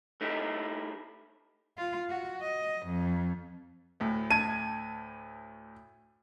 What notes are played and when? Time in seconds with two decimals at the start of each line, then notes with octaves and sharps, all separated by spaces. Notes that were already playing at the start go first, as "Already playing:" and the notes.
0.21 A3 D#4 E4 G4
1.78 F4
2.10 F#4
2.41 D#5
2.86 F2
4.00 D2 A2
4.31 A5 G#6 D#7